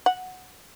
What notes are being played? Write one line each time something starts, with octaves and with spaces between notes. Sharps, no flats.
F#5